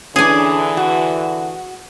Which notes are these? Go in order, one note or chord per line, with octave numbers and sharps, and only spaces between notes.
D3 E3 C#4 D4 G#4 G#5
F#4